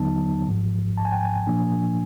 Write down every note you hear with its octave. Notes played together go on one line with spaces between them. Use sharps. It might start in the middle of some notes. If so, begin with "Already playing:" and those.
Already playing: D#2 D3 F#3 B3 D#4 A5
G#1 G#2 F3
A5
G#5
G5
G#5
A#2 F3 A#3 D4